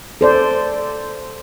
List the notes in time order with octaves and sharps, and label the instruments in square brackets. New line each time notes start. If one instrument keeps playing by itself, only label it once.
[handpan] A4 C5 D5